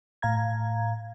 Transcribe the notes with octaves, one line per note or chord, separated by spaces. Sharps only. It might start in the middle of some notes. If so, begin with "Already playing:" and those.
A2 F5 A#5 G#6